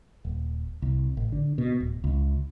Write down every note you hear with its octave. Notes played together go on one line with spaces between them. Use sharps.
D#1
C2
A1
D3
B2
D1
C#2